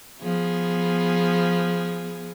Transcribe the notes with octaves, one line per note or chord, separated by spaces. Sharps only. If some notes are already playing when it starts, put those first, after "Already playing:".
F3 B3 G#4